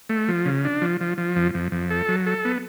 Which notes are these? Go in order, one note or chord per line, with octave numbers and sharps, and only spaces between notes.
A3
F3
C#3
D4
F3
F3
F3
F2
F2
F2
A4
F#3
A4
B3